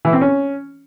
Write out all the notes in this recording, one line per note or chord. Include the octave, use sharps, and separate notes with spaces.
E3
C4
C#4